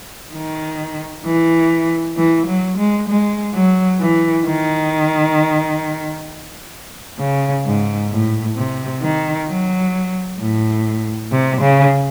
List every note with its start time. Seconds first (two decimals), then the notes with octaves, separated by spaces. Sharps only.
0.33 D#3
1.25 E3
2.17 E3
2.47 F#3
2.78 G#3
3.08 G#3
3.54 F#3
3.99 E3
4.46 D#3
7.19 C#3
7.65 G#2
8.11 A2
8.56 C3
9.02 D#3
9.48 F#3
10.39 A2
11.31 C3
11.61 C#3